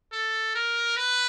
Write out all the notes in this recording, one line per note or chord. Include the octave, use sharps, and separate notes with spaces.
A4
A#4
B4